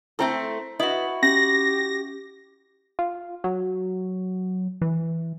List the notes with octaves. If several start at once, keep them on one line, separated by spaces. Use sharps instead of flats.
A3 C4 E4 A4 E6
E4 F#4 B4 D#5 D#6
C#4 G4 A#6
F4
F#3
E3